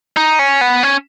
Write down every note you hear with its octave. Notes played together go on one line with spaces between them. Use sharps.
D#4
C#4
B3
C#4